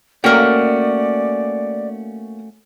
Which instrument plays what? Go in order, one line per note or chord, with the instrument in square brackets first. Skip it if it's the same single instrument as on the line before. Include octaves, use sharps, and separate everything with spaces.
[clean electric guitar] A3 C#4 F#4 [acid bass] A#3 [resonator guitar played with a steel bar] A#4 G5 [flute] D5